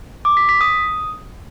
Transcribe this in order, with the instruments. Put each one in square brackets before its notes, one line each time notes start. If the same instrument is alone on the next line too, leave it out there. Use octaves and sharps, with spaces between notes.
[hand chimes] D6
B6
B6
D#6